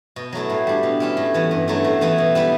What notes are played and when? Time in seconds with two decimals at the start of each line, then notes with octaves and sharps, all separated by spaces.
0.16 B2
0.32 F#3 A3 E4
0.50 A2
0.67 G3 D4
0.83 B2
1.00 G3 C#4 E4
1.17 A2
1.34 E3 B3
1.51 G2
1.68 F#3 A3 E4
1.84 A2
2.01 E3 B3 E4
2.18 B2
2.35 G3 B3 E4